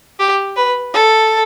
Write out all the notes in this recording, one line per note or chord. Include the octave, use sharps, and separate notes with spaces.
G4
B4
A4